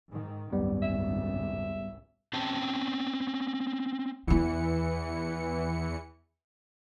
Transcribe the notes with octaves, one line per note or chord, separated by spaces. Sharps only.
G#2 D#3
G#1 C#2 F#2 G3 B3
E5
C4 C#4 G5 A5
E2 E3 B3 E4 C#7